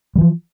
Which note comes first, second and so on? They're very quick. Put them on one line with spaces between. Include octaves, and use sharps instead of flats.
G3 E3 F3